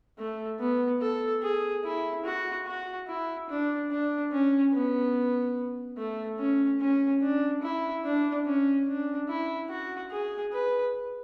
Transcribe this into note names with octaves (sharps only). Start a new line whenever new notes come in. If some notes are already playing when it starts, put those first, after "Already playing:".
A3
B3
A4
G#4
E4
F#4
F#4
E4
D4
D4
C#4
B3
A3
C#4
C#4
D4
E4
D4
C#4
D4
E4
F#4
G#4
B4